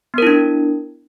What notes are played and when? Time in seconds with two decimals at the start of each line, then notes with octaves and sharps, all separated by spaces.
0.14 B3
0.18 A#4
0.22 E4
0.27 D4